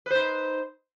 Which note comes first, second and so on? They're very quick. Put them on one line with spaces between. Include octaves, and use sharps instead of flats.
B4 C5 D#4